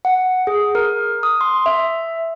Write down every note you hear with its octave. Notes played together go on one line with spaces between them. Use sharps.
F#5
G#4
A#4
D#6
C6
E5